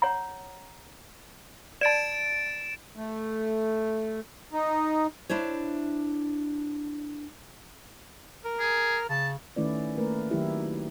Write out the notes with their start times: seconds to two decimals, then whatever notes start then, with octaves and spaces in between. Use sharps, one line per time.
0.02 C#5 F#5 A#5
1.81 D5 A5 A6 D7 E7
2.96 A3
4.53 D#4
5.29 D4 E4 C5 C#5
8.45 A#4
8.59 G#4
9.09 C#3 A5
9.56 D#3 A3 C#4 E4 B4 D5
9.97 A3 A#3 A#4 B4
10.31 D#3 F#3 D#4 E4 G4